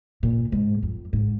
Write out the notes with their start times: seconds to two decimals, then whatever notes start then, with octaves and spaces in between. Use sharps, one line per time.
0.23 A#2
0.52 G#2
0.83 F2
1.13 G#2